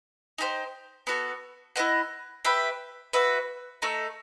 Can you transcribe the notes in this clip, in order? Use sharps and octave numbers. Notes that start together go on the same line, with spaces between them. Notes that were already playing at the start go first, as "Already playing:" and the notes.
D#4 G4 C5
B3 F#4 A4
E4 B4 D#5 F#5
G4 B4 E5
F#4 B4 E5
A3 D#4 A4